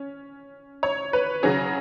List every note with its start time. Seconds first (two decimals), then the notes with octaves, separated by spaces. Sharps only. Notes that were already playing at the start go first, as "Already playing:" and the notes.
Already playing: C#4
0.83 C#5
1.13 B4
1.43 C#3 F#3 C#4 G#4